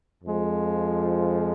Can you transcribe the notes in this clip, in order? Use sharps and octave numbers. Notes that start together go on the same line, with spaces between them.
F2 F3 G#3